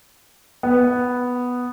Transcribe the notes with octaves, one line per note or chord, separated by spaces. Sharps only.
B3